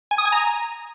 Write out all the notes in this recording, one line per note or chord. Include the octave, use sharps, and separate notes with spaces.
G#5
D#6
G#5
A#5